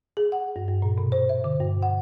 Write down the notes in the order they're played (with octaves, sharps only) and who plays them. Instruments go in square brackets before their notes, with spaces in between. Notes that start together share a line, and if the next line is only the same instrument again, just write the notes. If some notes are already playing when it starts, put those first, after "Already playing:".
[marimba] G#4
F#5
G2
G2
A#2
B2
C5
E5
D3
G2
F#5